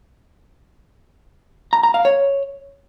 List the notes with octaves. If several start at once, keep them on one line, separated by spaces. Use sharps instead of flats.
A#5
A#5
F5
C#5